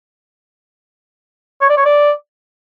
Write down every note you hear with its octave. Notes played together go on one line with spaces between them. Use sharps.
C#5
D5
C#5
D5